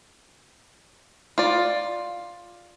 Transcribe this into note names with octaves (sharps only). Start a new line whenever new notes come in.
F4 D5